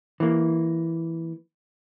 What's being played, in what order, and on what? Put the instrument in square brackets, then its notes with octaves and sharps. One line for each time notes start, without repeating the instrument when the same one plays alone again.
[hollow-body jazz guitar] E3 A#3